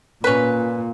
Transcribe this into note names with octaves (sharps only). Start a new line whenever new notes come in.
A#2 C#4 B4